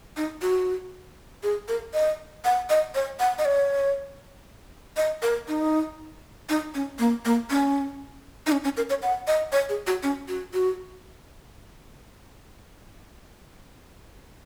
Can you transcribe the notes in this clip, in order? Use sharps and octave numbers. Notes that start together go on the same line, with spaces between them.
D#4
F#4
G#4
A#4
D#5
F#5
D#5
C#5
F#5
D#5
C#5
D#5
A#4
D#4
D#4
C#4
A#3
A#3
C#4
D#4
C#4
C#4
A#4
C#5
F#5
D#5
C#5
G#4
F#4
C#4
F#4
F#4